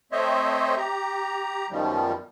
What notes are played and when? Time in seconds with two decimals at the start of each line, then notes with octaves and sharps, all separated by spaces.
0.12 A3 C4 C5 C#5 D#5 E5
0.77 G4 A#5
1.70 F#2 B2 D#3 F3 G3